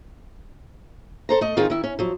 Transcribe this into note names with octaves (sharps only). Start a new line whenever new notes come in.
A4 C5 A#5
A3 D#5
D#3 C4 D#4 F4 G#4
D#3 E4
C#4
F3 F#3